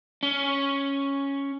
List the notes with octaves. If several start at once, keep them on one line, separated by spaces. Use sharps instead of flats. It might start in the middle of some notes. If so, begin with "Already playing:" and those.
C#4